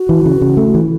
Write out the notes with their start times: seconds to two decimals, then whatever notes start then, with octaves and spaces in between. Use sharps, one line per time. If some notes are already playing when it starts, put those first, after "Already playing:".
Already playing: F#4
0.09 E3
0.25 C#3
0.42 C#3
0.57 A3
0.74 E3